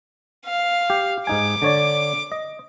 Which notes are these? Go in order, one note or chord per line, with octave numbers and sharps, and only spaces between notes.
F5
G4
G#2 D#4 G#5 D6
D3 C#5 D5
D#5